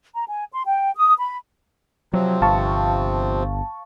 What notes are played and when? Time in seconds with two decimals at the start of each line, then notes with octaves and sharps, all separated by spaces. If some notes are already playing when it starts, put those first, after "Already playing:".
0.13 A#5
0.28 G#5
0.52 C6
0.66 G5
0.95 D#6
1.18 B5
2.13 C3 F3 F#3 C4
2.42 G1 F5 A5 C#6